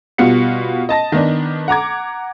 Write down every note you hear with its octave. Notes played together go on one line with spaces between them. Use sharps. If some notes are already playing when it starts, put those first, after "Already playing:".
B2 G3 B3 F4 F#5 C#7
D#5 A5 A#6
D#3 B3 D4
F#5 A#5 D6 G#6